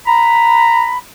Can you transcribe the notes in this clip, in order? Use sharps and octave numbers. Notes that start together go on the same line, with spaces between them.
A#5 B5